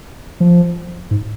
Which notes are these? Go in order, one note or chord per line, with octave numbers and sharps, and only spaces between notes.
F3
G#2